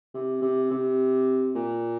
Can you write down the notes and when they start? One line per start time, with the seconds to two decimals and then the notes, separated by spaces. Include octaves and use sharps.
0.14 C3
0.42 C3
0.71 C3
1.55 A#2